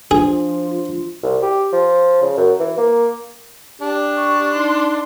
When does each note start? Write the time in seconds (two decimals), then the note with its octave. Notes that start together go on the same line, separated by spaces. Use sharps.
0.11 F3 D4 F4 G#4
1.23 C2
1.42 G4
1.72 F3
2.22 C#3
2.37 F#2
2.60 E3
2.78 A#3
3.82 D4 G4
4.17 C#6
4.54 D#4 C6